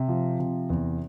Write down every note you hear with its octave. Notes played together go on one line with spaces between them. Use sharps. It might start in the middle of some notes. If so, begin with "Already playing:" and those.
Already playing: C3
F3
C3
E2